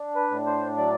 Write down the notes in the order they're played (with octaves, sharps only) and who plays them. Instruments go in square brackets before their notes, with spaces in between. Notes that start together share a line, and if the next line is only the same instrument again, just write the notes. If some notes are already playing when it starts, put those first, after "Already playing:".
Already playing: [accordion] D4
B4
A2
C5
F#3 D5